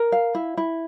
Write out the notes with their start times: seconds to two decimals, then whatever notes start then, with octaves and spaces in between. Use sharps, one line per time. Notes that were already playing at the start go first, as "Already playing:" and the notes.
Already playing: A#4
0.12 F5
0.35 E4
0.57 E4